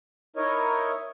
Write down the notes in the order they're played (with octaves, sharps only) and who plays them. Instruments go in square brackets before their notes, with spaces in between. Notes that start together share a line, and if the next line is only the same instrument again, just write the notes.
[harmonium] D#4 E4 A#4 C#5 D#5